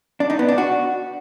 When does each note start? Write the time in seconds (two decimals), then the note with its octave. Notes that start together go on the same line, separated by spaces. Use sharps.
0.20 D4
0.30 D#4
0.39 B3
0.48 D4
0.58 F#4